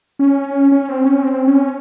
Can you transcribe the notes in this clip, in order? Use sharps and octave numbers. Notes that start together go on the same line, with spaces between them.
C#4
C#4
C4
C#4
C4
C#4